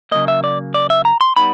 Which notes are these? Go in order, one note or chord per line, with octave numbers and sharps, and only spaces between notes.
C#3 F#3 A#3 D#5
E5
D5
D5
E5
A#5
C6
G3 B3 D#4 B5